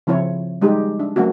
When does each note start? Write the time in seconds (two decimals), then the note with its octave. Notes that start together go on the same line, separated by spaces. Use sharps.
0.07 C#3 F3 C4 E4 C#5
0.61 G3 G#3 D#4 G4 G#4
1.00 D4
1.16 F#3 A3 A#3 C#4 F#4